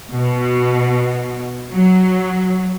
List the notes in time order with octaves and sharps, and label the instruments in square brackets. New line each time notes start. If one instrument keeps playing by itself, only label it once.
[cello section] B2
F#3